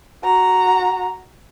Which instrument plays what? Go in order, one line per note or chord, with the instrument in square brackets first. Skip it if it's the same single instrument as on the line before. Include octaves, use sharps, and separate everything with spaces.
[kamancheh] F#4 A#5